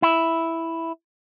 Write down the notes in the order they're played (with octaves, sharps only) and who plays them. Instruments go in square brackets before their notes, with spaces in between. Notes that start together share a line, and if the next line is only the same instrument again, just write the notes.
[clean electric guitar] E4